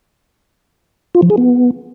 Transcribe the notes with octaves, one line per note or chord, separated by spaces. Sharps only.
F4
F3
G#4
B3